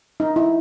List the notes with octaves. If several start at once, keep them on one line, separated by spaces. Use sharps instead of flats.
D#4
E4